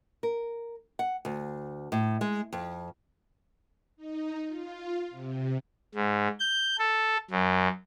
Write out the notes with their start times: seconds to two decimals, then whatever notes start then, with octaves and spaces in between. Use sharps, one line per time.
0.23 A#4
0.99 F#5
1.25 D2
1.92 A2
2.21 G#3
2.52 F2
3.97 D#4
4.47 F4
5.10 C3
5.95 G#2
6.39 G6
6.79 A4
7.31 F#2